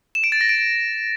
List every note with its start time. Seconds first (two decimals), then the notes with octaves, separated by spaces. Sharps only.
0.15 E7
0.24 D7
0.32 A6
0.41 A#6
0.49 D7